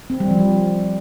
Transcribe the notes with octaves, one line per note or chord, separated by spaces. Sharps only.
C4
G3
F3